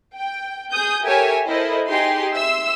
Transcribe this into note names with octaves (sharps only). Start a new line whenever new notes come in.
G5
G#4 G#5 D#6 G6
G4 A4 A#4 C#5 E5 G#5
E4 A4 A#4 C5 D#5
D#4 G4 G#4 C6
E5 C6 E6